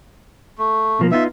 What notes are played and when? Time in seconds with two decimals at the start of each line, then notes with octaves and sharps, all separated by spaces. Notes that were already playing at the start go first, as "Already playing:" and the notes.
0.58 A3
0.99 B2 F3 A#3
1.11 B3 D#4 F4 E5